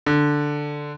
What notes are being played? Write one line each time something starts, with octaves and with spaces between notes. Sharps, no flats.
D3